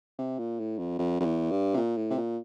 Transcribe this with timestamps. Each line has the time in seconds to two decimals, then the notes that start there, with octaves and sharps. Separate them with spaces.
0.19 C3
0.38 A#2
0.59 A2
0.78 F2
0.99 F2
1.20 F2
1.25 E2
1.51 G2
1.74 C3
1.77 A#2
1.97 A2
2.10 C3
2.17 A#2